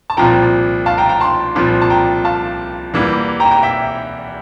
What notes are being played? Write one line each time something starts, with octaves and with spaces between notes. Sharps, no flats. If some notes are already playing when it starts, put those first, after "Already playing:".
A5
C2 A#2 F3 G5 A#5
F5 A5
G5 A#5
G5 A#5
A5 C6
C2 A#2 F3
A5
G5 A#5
F5 A5
E2 E3 G3 A#3
G5 A#5
G5 A#5
E5 G5